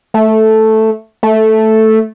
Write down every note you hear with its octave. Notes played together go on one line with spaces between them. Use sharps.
A3
A3